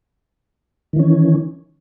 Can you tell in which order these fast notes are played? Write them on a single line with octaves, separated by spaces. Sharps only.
D#3 E3 C#4